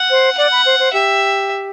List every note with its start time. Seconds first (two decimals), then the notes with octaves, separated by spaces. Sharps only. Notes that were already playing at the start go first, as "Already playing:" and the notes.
Already playing: F#5
0.10 C5
0.37 D5 F#5
0.52 B5
0.66 C5
0.79 C5
0.93 G4 E5